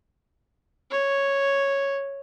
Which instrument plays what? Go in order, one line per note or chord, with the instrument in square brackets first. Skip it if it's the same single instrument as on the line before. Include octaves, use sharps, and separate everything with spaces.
[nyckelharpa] C#5